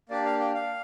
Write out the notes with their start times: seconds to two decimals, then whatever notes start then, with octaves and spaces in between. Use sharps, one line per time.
0.09 A#3 D4 G4 D5
0.25 F5
0.40 G5
0.55 F5